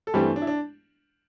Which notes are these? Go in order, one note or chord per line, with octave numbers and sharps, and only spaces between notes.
A4
G2 E3 G3 A3 C4 G4
D4
E4
D4